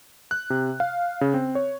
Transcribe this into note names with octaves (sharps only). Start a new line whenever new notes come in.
F#6
C3
F5
C#3
C4
C#5